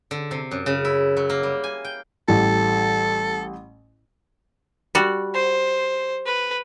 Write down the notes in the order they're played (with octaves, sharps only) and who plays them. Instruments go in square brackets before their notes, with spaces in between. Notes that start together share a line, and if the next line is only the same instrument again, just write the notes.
[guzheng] D3
C3
F#2
C#3
E4
F#3
A#3
G3
G#5
G5
[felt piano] A1 G3 [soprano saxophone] A4
[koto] G3 F#4
[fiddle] C5
B4